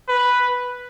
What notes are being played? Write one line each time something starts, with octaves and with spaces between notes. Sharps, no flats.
B4